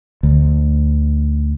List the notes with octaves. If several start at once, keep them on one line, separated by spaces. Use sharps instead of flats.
D2